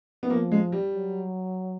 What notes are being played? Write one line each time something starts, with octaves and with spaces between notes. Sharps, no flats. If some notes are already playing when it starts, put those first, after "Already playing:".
B3
F3 A#3
G#3
G3
F#3